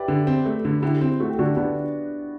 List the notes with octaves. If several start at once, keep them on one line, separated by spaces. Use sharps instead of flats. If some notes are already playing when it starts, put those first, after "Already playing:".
Already playing: G4 B4 D5 E5
D3
C4
A3
D3
D3 E4 G4
C4
A3 F#4
G4
D3 D4 F#4
D3 B3 D4